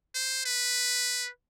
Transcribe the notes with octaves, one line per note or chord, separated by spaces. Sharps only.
C5
B4